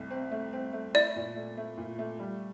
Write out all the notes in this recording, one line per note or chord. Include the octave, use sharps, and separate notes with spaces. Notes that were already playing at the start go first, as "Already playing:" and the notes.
Already playing: C2 A3
C4
A3
C4
A3
E4 D5
A#2
A3
A3
A#2
A3
G3